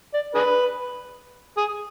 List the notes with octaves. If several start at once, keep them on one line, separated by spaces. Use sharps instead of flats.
D5
D4 G#4 B4
G#4